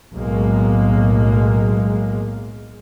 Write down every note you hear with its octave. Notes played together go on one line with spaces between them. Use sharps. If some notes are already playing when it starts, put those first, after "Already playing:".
B1 A2 G#3 A#3